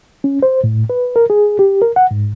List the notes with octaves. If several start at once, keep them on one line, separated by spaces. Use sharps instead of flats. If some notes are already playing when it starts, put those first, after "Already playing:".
C#4
C5
A2
B4
A#4
G#4
G4
A#4
F#5
G#2